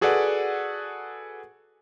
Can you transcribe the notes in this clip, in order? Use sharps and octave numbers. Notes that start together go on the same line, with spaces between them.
F#4 G#4 A4 B4 D5 F#5